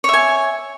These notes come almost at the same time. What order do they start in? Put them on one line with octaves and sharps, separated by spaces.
C#5 E5 G#5